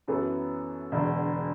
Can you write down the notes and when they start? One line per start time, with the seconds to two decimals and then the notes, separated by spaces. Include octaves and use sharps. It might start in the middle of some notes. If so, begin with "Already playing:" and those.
0.08 F#2 E3 B3 F#4 A4
0.92 E1 E2 D3